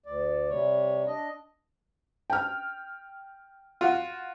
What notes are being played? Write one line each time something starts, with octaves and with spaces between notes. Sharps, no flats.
D2 D5
C3 G3 C#5
D4 D#5
G5 F6
F4 F#4